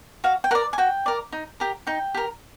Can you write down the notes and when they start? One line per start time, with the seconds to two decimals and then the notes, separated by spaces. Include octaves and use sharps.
0.24 F#4 F5
0.44 G5
0.51 A#4 F#5
0.55 D5
0.73 G#5
0.78 F#4 G5
1.06 A#4 D5
1.32 D#4
1.60 G4 A#4
1.87 D#4 G5
2.14 G4 A#4